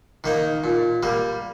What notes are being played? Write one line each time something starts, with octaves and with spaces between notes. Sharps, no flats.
D#3 A#3 D#4
A#2
G3 A#3